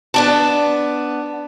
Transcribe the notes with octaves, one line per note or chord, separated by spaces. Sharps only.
B3 D4 A5